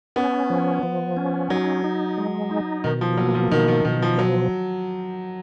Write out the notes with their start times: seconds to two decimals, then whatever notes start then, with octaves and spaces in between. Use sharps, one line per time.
0.16 B3 C#4
0.50 F3
0.83 F3
1.17 C#4
1.50 F#3 D#4
1.84 D#4
2.18 G#3
2.51 D#4
2.84 B2 D#3
3.01 F3
3.17 F#3 A#3
3.34 F3
3.51 B2 D#3
3.68 D#3
3.85 B2 D#3
4.02 F3
4.18 F3 F#3